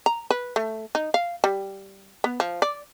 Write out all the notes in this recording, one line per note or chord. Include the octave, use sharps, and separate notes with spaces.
A#5
B4
A3
D#4
F5
G3
B3
F3
D5